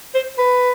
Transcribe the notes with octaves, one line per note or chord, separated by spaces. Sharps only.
C5
B4